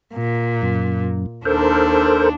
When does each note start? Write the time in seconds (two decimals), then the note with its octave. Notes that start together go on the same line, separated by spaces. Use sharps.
0.14 A#2
0.62 F#2
1.45 D#2 D4 A4 A#4 C5